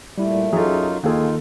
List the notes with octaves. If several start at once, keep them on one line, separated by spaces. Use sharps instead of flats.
A#2 G3 A3 E4
F#2 F#3 D#4 F4 G#4 A4 E5
D#2 D#3 A#3 D#4 F4 G#4 A4